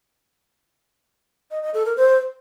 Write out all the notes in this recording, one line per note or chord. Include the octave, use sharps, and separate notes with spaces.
D#5
D#5
A4
A#4
C5